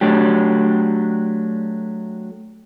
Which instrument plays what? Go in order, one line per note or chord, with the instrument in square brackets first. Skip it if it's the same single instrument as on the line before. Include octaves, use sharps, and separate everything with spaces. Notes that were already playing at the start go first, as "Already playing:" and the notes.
[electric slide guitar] F#3 A3 D4 G4